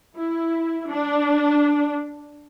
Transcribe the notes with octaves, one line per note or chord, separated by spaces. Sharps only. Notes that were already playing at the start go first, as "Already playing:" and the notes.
E4
D4